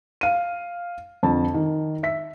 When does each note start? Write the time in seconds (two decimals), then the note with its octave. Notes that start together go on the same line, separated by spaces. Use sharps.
0.21 F5 D#7
1.23 F2 D3 A5
1.54 D#3
2.03 E5 B6